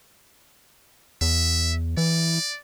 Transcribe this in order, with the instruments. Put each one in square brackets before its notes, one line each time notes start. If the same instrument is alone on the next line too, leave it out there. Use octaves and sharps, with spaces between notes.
[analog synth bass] E2 [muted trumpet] E5
[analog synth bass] E3 [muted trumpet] D5